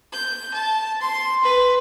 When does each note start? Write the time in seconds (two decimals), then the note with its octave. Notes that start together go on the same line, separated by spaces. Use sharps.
0.12 G6
0.54 A5
1.01 C6
1.43 B4